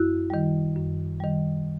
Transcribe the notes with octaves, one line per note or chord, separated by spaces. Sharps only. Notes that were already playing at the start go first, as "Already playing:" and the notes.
Already playing: F#2 E4 F#4
D#3 G3
F#2
D#3 G3